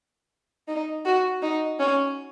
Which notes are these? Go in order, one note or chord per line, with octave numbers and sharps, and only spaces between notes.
D#4
F#4
D#4
C#4